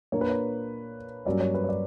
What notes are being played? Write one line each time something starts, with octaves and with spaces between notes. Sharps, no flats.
A#2 A#3 D4 C#5
B4
C#5
G2 F#3 A#3 C#4 D5
C#5
B4
C#5
D5